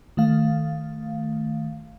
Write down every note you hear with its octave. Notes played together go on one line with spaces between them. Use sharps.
D#3 A3 F5